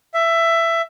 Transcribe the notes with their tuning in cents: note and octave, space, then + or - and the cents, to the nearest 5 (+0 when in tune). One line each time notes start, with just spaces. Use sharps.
E5 +15